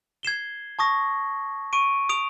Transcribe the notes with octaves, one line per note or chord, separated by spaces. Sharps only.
G#6 C7 E7 G7
A5 C#6 D#6 A#6
C#6 D7 D#7
D#6 D7 F7